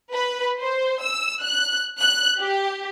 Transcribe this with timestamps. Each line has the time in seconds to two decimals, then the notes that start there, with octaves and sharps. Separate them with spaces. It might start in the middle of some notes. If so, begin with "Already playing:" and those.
0.13 B4
0.60 C5
1.03 E6
1.43 F#6
1.99 F#6
2.39 G4